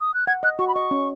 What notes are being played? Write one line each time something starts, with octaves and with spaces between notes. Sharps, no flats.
D#6
F#6
F#5 G#6
D#5 F#6
F#4 C#6
B5
D#5 C#6
C#4